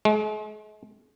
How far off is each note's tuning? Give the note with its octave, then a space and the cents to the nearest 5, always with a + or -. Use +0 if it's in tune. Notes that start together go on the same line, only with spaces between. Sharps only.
G#3 +40